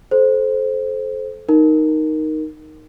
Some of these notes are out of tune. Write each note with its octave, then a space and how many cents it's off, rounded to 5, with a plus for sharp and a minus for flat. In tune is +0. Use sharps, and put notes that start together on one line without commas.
A4 -30 C5 +0
D#4 +0 A#4 +0